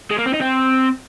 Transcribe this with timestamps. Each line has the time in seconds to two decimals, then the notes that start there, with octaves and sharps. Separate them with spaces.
0.11 G#3
0.18 A#3
0.26 C4
0.33 D#4
0.41 C4